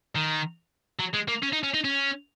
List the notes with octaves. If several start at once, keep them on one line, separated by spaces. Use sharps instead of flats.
D#3
F#3
G#3
A#3
C#4
D#4
C#4
D#4
C#4